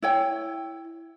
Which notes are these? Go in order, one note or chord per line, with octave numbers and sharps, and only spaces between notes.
E4 C#5 G5